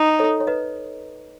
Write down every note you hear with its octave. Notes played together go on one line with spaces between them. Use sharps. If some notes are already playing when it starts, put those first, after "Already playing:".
Already playing: D#4
A4 C#5
C#5
B4 D#5